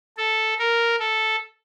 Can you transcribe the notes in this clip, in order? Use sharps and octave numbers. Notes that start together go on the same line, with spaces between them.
A4
A#4
A4